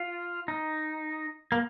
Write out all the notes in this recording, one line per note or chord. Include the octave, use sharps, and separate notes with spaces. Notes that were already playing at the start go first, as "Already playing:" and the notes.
Already playing: F4
D#4
A#3